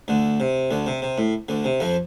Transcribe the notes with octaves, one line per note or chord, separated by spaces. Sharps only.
D2 D3
C3
D2 D3
C3
C3
A2
D2 D3
C3
F2 F3